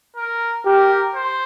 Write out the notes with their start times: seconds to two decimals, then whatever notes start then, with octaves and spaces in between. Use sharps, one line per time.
0.16 A#4
0.66 G4 A#4
1.15 C5